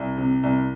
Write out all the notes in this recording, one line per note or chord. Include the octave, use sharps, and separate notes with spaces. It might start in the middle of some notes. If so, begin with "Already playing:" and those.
Already playing: C2
C3
C2